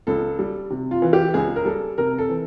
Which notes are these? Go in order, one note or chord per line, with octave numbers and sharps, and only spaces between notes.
C#2 A4
G3
C3
F4
E3
G4
C#2 G#4
A#4
G3 A4
C3 A#4
A4
E3